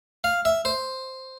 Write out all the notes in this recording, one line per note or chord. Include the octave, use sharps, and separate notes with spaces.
F5
E5
C5